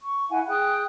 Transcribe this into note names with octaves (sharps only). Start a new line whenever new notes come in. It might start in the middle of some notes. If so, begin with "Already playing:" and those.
C#6
E4 F5 F#5 G#5
G#4 G5 D#6 F#6